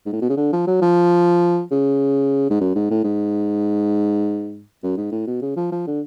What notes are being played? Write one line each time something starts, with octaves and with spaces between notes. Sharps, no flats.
G#2
A2
B2
C#3
D3
F3
F#3
F3
C#3
G#2
F#2
G#2
A2
G#2
F#2
G#2
A2
B2
C#3
F3
F3
D3